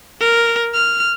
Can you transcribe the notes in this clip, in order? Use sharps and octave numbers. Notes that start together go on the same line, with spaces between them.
A#4
F6